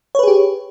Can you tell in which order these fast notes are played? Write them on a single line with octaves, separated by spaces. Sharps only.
C#5 B4 G#4 G4